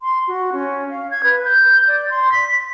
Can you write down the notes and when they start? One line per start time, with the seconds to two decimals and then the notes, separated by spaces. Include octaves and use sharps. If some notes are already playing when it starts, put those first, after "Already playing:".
0.02 C6
0.28 F#4
0.53 C#4
0.90 F5
1.11 G#6
1.24 B4
1.45 G6
1.87 D5
2.10 C6
2.32 B6